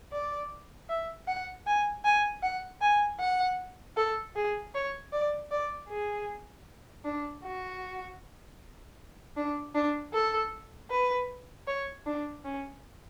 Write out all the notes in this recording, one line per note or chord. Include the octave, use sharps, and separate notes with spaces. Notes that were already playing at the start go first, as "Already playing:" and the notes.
D5
E5
F#5
G#5
G#5
F#5
G#5
F#5
A4
G#4
C#5
D5
D5
G#4
D4
F#4
D4
D4
A4
B4
C#5
D4
C#4